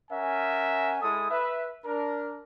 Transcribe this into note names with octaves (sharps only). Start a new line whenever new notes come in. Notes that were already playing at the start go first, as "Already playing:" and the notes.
C#4 A#4 E5 F#5 G#5
G#3 E4 A4 D#6
B4 E5
D4 A#4